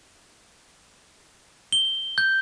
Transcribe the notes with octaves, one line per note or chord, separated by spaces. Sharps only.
G7
G6